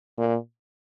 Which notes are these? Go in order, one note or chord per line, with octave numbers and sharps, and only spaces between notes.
A#2